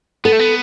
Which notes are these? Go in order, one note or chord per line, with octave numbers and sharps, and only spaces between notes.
B3 A4
A3
B3